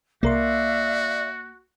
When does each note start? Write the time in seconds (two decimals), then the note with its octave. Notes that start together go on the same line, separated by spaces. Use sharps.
0.23 C2 A#3 F#4 A#4 D5 E5 F5 C6